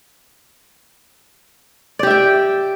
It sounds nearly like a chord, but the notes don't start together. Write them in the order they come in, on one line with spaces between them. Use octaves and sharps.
D5 G4 E5 G5